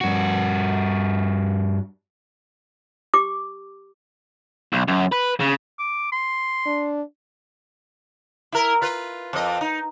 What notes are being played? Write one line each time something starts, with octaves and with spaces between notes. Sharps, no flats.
G2 F#4
G4 D6
B1
F#2
B4
C#3
D6
C6
D4
E4 A#4
F4 B4
F2 D#5
D#4